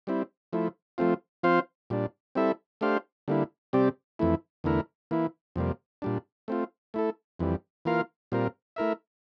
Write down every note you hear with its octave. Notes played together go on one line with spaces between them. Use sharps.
G3 C4 E4
F3 A3 E4
F3 A3 C4 F4
F3 C4 F4 C5 F5
A#2 G3 D4
G3 C4 E4 A4 E5
A3 D4 G4 C5 F5
D3 G3 A#3 E4
C3 G3 C4 G4 D5
F2 E3 A3 E4
E2 D3 A3 E4 A#4
E3 A#3 E4
F2 C3 G3 A#3
A#2 G3 D4
A3 C4 F4
A3 E4 A4
F2 E3 G3
E3 A#3 F4 A#4 F5
A#2 G3 C4 F4 A#4
A3 E4 A#4 E5